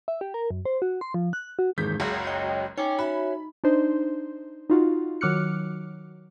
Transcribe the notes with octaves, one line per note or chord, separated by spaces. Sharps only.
E5
G4
A#4
F#2
C5
F#4
C6
F3
F#6
F#4
E2 G#2 D#3 G#4 G6 B6
F#1 C#2 F#2 F#4 F5 A#5 D#6
C#5 D#5 G5
D#4 C#5 G5 G#5 D6
F#4 E5 B5
D4 D#4 C5
D#4 F4 F#4
D#3 F#3 D6 F6 F#6 C#7